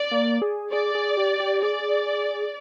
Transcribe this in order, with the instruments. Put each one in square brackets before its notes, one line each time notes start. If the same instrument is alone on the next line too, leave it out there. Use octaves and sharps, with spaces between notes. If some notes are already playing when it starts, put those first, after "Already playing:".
Already playing: [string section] D5
[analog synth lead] A#3
G#4
[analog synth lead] G#4 [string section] D5
[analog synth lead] G#4
G4
G4
[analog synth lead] G#4 [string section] D5